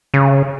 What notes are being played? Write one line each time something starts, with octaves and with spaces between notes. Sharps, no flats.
C#3